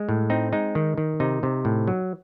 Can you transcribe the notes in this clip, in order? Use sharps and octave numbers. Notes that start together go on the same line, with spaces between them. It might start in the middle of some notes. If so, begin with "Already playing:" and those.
Already playing: G#3
A2
C4 D#4
G#3 D#4
D#3
D#3
C3 D#4
C3
A2
F#3